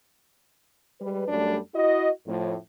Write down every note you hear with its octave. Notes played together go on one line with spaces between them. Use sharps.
G3 G#3 B4
F#2 G3 A3 D4
E4 F#4 D#5
F2 A2